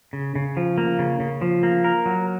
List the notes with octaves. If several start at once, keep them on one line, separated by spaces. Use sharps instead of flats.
C#3
C#3
F3
A#3
C#3
C#3
F3
A#3
A#4
F#3